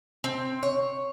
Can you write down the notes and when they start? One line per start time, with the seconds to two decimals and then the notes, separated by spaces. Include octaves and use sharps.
0.24 C4
0.63 C#5